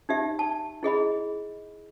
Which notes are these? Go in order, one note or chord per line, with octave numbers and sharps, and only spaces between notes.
D#4 G4 E5
A5
E4 G#4 D#5 B5